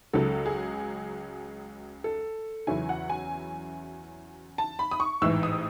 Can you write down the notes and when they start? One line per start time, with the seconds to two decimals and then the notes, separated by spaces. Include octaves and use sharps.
0.13 C#2 C#3 F#3 A4
0.46 G#4
2.04 A4
2.67 E2 C#3 F#3 C#4 E4 G#5
2.89 F#5
3.10 G#5
4.58 A5
4.79 B5
4.91 D#6
5.00 C#6
5.22 A1 G#2 E3 E6
5.43 D#6